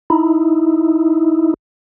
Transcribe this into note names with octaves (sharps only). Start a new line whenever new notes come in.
D#4 E4